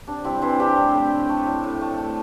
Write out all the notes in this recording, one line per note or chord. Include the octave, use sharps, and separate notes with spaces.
C3 D4
G3 C4 E4
E3 C4 E4
C3 D4 G4
A2
A2
A3
A3
A2
A2
A3
A3